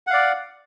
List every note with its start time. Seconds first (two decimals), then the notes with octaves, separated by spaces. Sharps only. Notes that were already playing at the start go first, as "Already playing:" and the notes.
0.07 F#5
0.10 F5
0.13 D5